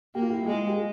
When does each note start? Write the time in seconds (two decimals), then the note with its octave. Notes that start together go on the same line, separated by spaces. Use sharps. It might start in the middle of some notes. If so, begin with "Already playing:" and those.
0.15 A#3 G4
0.22 F4
0.30 E4 G4
0.46 G#3 F4 G#4
0.67 G4
0.77 F4 G#4